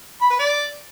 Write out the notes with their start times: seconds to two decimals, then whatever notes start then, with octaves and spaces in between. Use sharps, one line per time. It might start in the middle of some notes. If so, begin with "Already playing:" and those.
0.21 B5
0.30 B4
0.39 D5